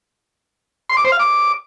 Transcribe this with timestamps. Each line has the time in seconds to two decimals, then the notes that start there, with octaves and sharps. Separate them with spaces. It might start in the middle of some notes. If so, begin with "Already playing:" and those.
0.90 C6
0.97 D6
1.05 C5
1.12 F5
1.20 D6